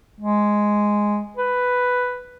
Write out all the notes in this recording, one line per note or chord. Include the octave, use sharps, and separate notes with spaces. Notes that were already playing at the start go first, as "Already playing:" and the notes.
G#3
B4